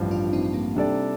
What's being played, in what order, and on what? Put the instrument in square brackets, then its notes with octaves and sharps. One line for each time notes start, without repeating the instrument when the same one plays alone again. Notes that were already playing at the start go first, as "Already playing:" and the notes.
Already playing: [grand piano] A1 G2 F3
[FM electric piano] D4 F4
C4 D#4
C4
A#3 D4
[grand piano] C3 G3 D4 A4 D5